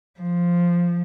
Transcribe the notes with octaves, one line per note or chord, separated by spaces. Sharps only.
F3